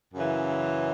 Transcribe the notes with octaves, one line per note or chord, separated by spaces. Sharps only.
F#2 C#3 E3